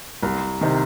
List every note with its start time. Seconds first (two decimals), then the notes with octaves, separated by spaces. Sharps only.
0.23 C2
0.61 C3 D#3